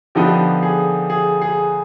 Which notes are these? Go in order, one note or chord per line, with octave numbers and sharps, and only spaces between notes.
D3 F3 B3 D#4 G4
G#4
G#4
G#4